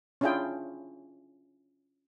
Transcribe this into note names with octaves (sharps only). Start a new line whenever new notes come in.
C#4 D4 E4 F4 G#4 G5